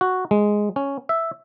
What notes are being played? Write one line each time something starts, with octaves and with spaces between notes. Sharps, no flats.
F#4
G#3
C#4
E5